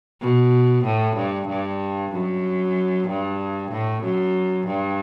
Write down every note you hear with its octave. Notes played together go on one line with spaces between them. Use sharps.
B2
A2
G2
G2
F#2
G2
A2
F#2
G2